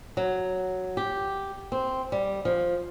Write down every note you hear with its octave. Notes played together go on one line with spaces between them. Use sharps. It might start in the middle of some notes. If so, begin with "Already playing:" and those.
F#3
G4
C4
G3
F3